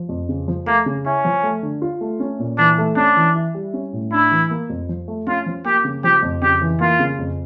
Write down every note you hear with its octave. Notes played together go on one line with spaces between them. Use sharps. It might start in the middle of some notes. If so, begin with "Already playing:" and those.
Already playing: F3
F2
C#3
F3
A3 A#3
C#3
C#4 E4
F3
A3
D3
F4
A3
C#4
A#2
E3 D4
A3
C#4 D4
E3
E4
G3
C#4
A2
D4 E4
E3
A#3
F2
F3
A3
C#4 F4
F3
A#3 G4
C#3
F3 G4
F2
C#3 G4
E3
A#3 F4
C#3
F2